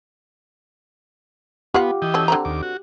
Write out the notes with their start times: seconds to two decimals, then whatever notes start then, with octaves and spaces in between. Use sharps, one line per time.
1.74 B3 F4 G4 F5 F#5
2.02 E3 D#5 G5
2.14 F#3 C#4 A4
2.28 D3 C4 A#5
2.45 D#2 D6
2.63 F#4